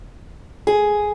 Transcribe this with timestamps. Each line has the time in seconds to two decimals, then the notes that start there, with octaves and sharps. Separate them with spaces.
0.67 G#4